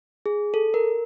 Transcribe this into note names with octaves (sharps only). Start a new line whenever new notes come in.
G#4
A4
A#4